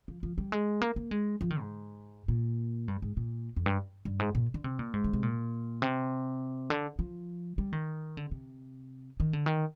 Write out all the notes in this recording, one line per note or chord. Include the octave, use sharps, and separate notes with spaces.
F3
F3
G3
G#3
A#3
A#3
G#3
F3
D#3
G#2
A#2
G2
G#2
A#2
F2
G2
G2
G#2
A#2
D3
C3
A#2
G#2
D3
C3
A#2
C3
D3
F3
G3
D#3
D3
C3
D#3
D3
D#3